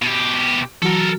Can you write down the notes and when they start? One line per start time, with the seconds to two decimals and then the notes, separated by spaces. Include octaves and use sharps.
0.02 B2 G4
0.82 E3 F#3 F#4 A4 A#4